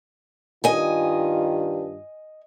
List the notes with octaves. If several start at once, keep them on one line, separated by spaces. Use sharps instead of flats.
G2 D#3 F4 D#5 G#5